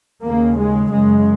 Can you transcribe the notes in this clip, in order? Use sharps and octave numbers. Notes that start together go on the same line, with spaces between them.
D#2 C#3 A#3
G#3
F#2 C#3 G#3